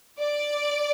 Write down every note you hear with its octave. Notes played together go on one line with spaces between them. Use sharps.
D5